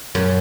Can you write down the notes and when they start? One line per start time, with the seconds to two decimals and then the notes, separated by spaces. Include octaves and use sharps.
0.15 F#2